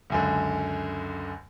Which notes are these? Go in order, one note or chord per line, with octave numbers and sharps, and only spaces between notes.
C#2 F#2 D3